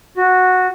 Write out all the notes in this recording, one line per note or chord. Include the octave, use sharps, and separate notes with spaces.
F#4